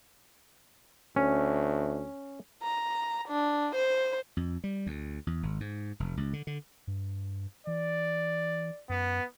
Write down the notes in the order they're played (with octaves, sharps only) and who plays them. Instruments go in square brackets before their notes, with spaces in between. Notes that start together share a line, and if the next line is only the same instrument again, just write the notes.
[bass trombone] D2 [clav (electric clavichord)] C#4
[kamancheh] A#5
D4
C5
[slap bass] F2
G3
D2
E2
G#1
G#2
F1
C#2
D3
D3
[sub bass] G2
[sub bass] E3 [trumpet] D5
[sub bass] F#2 [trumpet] B3